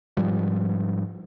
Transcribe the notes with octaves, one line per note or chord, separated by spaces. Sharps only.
G#2 F3 G3